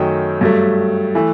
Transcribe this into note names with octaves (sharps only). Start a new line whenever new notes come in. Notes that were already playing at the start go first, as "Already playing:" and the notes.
Already playing: F#2 D#3 F#3 A3 G5
G2 F#3 A3
E3 A3